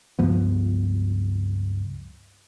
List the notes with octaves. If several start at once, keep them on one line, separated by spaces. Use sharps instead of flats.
C#2 G2 F3 B3